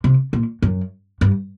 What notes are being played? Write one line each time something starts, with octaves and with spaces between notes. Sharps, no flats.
C3
A#2
F#2
G2